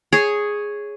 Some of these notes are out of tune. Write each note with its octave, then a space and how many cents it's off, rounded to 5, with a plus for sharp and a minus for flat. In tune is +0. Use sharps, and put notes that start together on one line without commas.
G#4 +0 C#5 +0